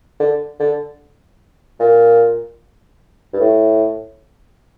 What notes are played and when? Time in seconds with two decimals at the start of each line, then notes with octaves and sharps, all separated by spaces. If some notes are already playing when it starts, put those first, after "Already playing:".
0.20 D3
0.60 D3
1.80 A#2
3.33 G2
3.40 A2